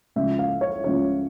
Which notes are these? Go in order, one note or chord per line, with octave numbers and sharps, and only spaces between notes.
C#2 C#3 F3 E5
F5
C#5
C#2 C#3 F3 C#5